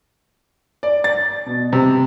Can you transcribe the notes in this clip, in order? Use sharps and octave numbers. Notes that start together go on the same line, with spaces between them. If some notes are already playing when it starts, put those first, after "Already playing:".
D5
A6
B2
C3